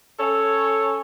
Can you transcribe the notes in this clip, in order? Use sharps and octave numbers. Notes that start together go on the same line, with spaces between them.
C#4 A4 C#5